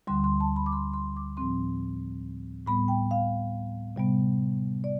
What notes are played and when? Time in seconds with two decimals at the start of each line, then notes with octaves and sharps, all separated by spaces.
0.07 D2 D3 G3 C6
0.24 C6
0.40 A5
0.56 B5
0.66 D6
0.72 C6
0.94 C6
1.16 D6
1.37 A2 F3 C4 C6
2.67 A2 G3 B3 B5
2.88 G5
3.11 F5
3.96 C3 G3 B3
4.84 D5